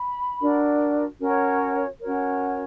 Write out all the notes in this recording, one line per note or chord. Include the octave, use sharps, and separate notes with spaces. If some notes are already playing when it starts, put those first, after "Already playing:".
Already playing: B5
D4 F#4 A#4
C#4 F#4 A#4 C#5
C#4 F#4 A#4 C#5